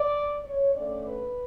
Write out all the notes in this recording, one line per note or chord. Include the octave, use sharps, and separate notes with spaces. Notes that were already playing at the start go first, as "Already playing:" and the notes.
Already playing: D5
C#5
D3 A3 C#4 D5
B4